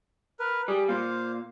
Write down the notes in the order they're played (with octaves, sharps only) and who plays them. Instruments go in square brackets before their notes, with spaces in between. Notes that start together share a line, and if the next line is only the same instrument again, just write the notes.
[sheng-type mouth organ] A#4 B4
[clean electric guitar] G3 [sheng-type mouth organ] G#4
[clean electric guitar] A#2 [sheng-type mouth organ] C5 F5